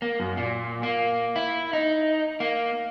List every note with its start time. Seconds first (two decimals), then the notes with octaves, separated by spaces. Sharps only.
0.02 A#3
0.20 F#2
0.37 A#2
0.83 A#3
1.36 E4
1.73 D#4
2.40 A#3